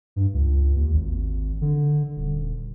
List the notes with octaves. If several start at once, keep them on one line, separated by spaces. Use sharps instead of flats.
G2
C#2
D#2
G#1
D3
D#1